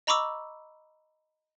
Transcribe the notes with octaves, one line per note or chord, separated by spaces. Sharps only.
D#5 A#5 B5 C#6 D6 E6